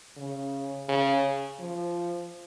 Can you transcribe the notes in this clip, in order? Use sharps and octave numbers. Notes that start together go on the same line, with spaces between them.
C#3
C#3
F3